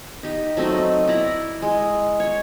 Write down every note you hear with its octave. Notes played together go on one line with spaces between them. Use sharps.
D#4 G4
F#3 A3 C4 D#4
D#4
E4 D5 A#5 B5
G#3
C#5